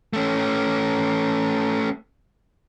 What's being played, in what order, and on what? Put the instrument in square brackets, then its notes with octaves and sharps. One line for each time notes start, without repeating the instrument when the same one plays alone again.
[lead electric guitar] A3 C#4